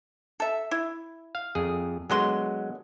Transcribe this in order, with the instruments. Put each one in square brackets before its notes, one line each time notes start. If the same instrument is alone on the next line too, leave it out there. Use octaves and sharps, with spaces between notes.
[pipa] A4 E5
E4
[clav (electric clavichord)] F5
F2 G#4
[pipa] D3 F#4 C6 [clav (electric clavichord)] F#3 G#3 B3